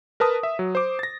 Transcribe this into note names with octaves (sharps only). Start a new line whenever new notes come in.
A#4 B4 A5 D#6
E5
F#3
C5 D6
A6 A#6